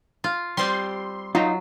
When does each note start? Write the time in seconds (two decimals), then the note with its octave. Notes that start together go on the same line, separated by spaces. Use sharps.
0.24 F4
0.57 G3 C4 G4 C6
1.35 F#3 D#4 F4